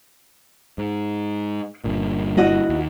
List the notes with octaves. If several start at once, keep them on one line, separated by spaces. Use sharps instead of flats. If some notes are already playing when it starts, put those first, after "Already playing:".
G#2
G1 G2 A#2
E4 F#4 D#5
D#2